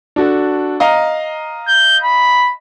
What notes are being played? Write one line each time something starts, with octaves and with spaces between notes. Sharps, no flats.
D4 F#4 A4
D#5 F5 A#5
G6
B5